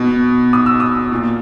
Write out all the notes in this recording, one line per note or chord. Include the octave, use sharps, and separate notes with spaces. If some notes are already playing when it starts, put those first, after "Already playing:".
Already playing: B2
D#6
E6
D#6
A#2